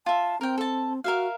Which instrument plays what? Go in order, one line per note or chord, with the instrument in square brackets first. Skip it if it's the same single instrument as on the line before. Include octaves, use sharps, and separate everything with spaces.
[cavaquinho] F4 E5 [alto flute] A5
[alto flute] C4 [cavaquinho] A#4 G5
[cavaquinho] A4 A5
[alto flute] F#4 [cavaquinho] A#4 E5 F5